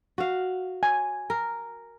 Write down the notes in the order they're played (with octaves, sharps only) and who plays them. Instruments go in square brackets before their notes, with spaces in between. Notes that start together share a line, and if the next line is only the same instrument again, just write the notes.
[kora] F#4 F5
[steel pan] G#5
[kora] A#4